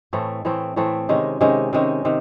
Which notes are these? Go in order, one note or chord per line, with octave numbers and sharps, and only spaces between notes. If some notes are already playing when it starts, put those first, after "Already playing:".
A2 E3 A3 C4
A2 E3 A3 C4
A2 E3 A3 C4
C3 D#3 G#3 C#4
C3 D#3 G#3 C#4
C3 D#3 G#3 C#4
C3 D#3